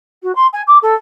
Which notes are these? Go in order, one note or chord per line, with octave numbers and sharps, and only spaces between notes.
F#4
C6
G#5
D6
A4